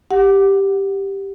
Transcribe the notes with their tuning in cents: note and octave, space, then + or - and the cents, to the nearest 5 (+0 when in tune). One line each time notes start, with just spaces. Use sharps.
G4 +0 F#5 +0